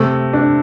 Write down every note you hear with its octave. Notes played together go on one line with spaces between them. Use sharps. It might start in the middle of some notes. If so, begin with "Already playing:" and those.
Already playing: C3 A3
D4